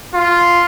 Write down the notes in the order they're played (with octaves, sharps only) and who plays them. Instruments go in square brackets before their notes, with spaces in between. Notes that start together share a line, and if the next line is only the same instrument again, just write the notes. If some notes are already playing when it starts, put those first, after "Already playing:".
[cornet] F4